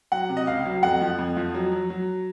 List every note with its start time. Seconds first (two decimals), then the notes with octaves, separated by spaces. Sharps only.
0.12 F#3 F#5
0.29 C3
0.37 D#5
0.47 C#2 F5
0.65 F#3
0.83 F2 F#5
1.01 F3
1.19 F2
1.37 F3
1.54 F#3
1.72 F#3
1.90 F#3